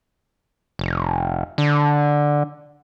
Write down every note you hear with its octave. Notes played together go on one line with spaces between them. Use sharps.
F1
D3